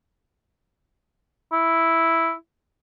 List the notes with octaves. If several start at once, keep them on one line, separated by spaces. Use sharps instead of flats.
E4